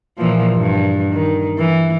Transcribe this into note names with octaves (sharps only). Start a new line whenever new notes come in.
A#2 E3 F3
G2
D#3
E3